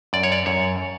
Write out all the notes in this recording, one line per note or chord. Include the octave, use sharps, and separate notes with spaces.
F#2 D5
C#5
D5
F#2 C#5